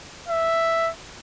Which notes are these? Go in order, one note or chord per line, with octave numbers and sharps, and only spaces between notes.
E5